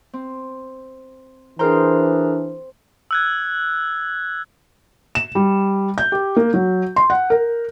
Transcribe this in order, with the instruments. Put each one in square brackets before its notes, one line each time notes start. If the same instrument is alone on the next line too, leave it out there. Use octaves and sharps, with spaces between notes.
[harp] C4
[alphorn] E3 [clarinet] D4 [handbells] G#4 A#4 A#5 [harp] C5 G5
[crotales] E6 F#6 G#6
[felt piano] E7
G3
G6
G4
A#3
F#3
C6
F#5
A#4